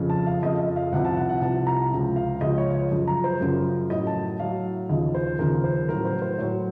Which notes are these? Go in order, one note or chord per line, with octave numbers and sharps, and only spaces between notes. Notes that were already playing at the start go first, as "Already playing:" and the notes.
Already playing: F2 C#3 F3
A5
F5
F2 C#3 F3 D#5
D#5
F5
C2 C3 F3 F#5
A5
F#5
F#5
C2 C3 F3 A5
A#5
C#2 C#3 F3
F5
C#2 C#3 F3 D#5
C#5
C#5
F#2 C#3 F3
A#5
C5
F#2 C#3 F3 A#4
A2 F#3 D#5
A5
A2 F#3 F5
D#2 C#3 F3 D#5
C5
D#2 C#3 F3 A#4
C5
A2 F#3 A#4
C5
C5
A2 F#3 C#5